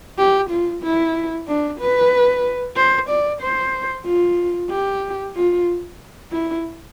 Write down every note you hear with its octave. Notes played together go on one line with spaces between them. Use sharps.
G4
F4
E4
D4
B4
C5
D5
C5
F4
G4
F4
E4